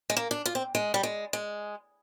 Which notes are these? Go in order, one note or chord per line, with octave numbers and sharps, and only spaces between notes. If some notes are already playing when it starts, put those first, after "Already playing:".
G#3
A#3
D4
F4
C4
G#3
G3
G#3
G#3